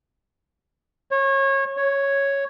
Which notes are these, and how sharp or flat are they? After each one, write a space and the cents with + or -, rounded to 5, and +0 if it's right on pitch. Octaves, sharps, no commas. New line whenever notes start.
C#5 -25
C#5 +0